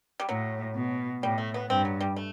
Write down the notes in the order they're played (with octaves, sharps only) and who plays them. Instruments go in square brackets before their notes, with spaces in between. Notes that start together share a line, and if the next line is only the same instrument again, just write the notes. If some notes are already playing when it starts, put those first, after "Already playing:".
[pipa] G3
[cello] A2 [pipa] F#3
[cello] B2
[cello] A2 [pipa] G3
[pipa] A3
B3
[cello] G2 [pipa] C4
[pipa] F#3
G3
A3